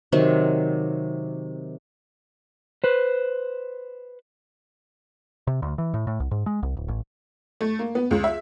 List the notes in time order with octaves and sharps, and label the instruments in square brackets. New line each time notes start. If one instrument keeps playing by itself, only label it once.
[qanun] C3 D#3 F#3 C4
[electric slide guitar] B4 C5
[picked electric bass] C3
D2
E3
A2
A2
C2
G#2
G#3
C2
D1
A1
[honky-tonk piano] A3
A#3
B3
C#2
E5